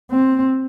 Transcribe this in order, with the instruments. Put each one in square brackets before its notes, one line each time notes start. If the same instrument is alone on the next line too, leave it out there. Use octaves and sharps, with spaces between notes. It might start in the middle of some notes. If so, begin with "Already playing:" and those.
[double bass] C4